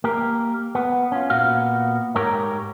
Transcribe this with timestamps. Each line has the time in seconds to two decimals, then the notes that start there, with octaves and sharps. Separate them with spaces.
0.04 A#3 G4 A#4
0.75 B3
1.12 C#4 F4
1.30 A#2 B3 F#4 F5
2.16 G#2 G4 A#4 C#5 A#5